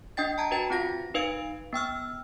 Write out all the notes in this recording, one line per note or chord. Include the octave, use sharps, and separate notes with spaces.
D4 D#5 G5 A6
A5 A#5 G#6
F#4 B4 G5 A6
C4 F4 F#5 A#6
D#4 B4 F5 G#6 D7
B3 G5 E6 F6